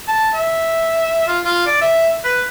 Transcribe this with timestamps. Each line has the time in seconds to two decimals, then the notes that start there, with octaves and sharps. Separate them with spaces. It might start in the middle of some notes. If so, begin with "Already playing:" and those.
0.08 A5
0.34 E5
1.27 F4
1.45 F4
1.66 D5
1.81 E5
2.25 B4